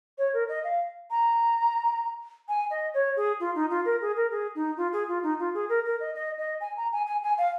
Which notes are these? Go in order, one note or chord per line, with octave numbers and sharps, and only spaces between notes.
C#5
A#4
D#5
F5
A#5
G#5
D#5
C#5
G#4
F4
D#4
F4
A#4
G#4
A#4
G#4
D#4
F4
G#4
F4
D#4
F4
G#4
A#4
A#4
D#5
D#5
D#5
G#5
A#5
G#5
G#5
G#5
F5